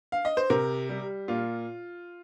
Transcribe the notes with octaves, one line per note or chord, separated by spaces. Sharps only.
F5
D#5
C5
C3 A#4
G3
A#2 F4